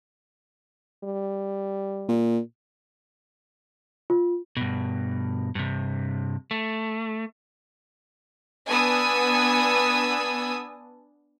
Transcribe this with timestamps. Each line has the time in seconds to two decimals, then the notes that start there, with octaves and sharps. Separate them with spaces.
1.04 G3
2.08 A#2
4.10 F4
4.57 G2 B2
5.55 G2 C3
6.51 A3
8.68 B3 D4 G#5 D#6 E6